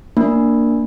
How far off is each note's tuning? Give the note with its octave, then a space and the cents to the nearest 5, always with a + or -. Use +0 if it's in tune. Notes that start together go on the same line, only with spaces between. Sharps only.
A#3 +0 D4 +0